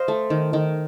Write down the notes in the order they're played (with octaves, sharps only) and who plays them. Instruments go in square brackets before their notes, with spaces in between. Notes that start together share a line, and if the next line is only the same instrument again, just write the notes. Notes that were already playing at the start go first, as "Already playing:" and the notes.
Already playing: [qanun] C5 D#5 F5
A3
D#3
D#3